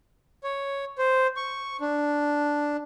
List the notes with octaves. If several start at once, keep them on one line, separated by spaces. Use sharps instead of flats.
C#5
C5
C#6
D4